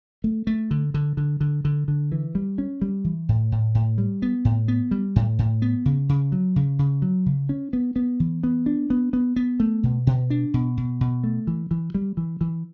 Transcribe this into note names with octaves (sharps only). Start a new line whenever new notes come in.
A3
A3
D3
D3
D3
D3
D3
D3
E3
G3
C#4
G3
E3
A2
A2
A2
G3
B3
A2
B3
G3
A2
A2
B3
C#3
C#3
F#3
C#3
C#3
F#3
C#3
C#4
B3
B3
E3
B3
D4
B3
B3
B3
A3
B2
B2
D4
B2
B2
B2
A3
E3
E3
G3
E3
E3